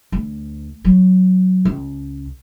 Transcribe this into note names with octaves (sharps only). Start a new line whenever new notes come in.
D2
F#3
C#2